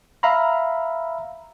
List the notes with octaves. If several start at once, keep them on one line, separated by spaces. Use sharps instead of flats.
E5 F5 A#5 B5